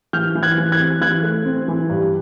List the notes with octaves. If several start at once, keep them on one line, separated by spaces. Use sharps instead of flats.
E3 F6 G6
E3
F#6 G#6
E3
F#6 G#6
C4
E3 F#6 G#6
A3
C4
E3
G2